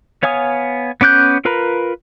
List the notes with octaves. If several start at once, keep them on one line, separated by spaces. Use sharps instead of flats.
B3 C#5 F5 G#5 D#6
B3 C#4 D6 F#6 G6
F4 A#4 B4 A#5 B5